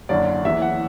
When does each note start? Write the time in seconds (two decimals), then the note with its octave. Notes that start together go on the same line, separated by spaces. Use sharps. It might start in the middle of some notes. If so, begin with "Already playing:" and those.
0.09 F#1 F#2 D3 D5
0.44 F#1 E2 E3 E5
0.62 F#5